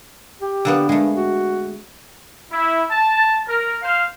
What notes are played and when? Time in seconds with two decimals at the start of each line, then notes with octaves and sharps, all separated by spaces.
0.42 G4
0.65 D3 A#3 B3
0.89 G2 G#3 A3
1.17 F#4
2.51 E4
2.91 A5
3.47 A#4
3.82 C5 F5